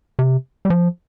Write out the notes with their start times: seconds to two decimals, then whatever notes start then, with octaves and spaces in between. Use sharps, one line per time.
0.19 C3
0.65 G3
0.70 F3